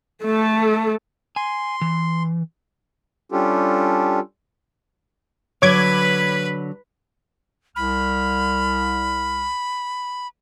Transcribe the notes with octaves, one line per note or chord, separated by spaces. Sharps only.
A3 A4
G#5 C6
E3
G3 C#4 D4 F4 G4 A4
D3 F#3 B4 C#5 B5 D6 G#6
C2 B5 F6